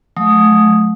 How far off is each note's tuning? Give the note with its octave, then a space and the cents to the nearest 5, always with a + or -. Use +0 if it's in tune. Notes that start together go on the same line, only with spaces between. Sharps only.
F#3 -40 A3 -35 D#6 +0